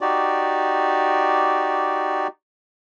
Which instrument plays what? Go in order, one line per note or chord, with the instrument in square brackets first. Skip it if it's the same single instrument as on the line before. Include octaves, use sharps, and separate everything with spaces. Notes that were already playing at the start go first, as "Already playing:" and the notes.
[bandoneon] D#4 F#4 G4 D5